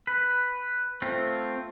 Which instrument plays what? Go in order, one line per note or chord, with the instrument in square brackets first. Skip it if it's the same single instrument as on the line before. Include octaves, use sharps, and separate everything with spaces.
[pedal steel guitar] B4
A3 C4 F4